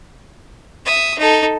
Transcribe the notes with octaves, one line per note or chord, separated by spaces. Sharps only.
E5 D#6
D#4 A4